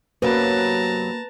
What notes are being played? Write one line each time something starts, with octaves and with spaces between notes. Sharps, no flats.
F#2 C3 F#3 A#3 B4 A5 A#5